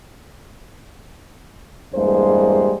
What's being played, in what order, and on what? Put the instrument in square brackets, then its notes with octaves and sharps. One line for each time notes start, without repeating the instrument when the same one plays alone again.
[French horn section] E2 G2 G3 G#3 A#3 C5